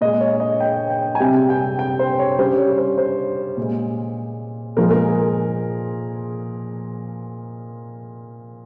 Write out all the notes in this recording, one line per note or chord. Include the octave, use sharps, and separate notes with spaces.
A#2 G#3 D#5
C#5
D#5
G5
G5
G#5
C3 G3 G5
G5
G5
C5
C#5
C#3 G3 C5
C#5
C5
C5
A#2 G#3
A#2 F3 G#3 A#4
A#4
G#4